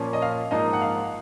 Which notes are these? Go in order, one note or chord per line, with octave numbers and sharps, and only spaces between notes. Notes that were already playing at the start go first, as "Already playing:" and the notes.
Already playing: A#2 F3 A#3 C#4
D#5
F5
G#2 F3 A#3 D#4 D#5
F#5
F5